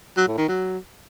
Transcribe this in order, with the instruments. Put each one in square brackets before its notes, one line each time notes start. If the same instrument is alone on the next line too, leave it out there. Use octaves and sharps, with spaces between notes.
[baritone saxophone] F#3
A2
D#3
F#3